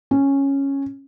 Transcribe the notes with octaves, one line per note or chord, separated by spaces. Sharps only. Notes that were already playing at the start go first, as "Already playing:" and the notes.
C#4